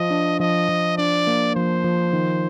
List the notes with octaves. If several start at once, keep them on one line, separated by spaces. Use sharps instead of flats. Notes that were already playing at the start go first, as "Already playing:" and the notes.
Already playing: F3 D#5
D4
F3 D#5
F3
D4 D5
A#3
F3 C5
F3
D#3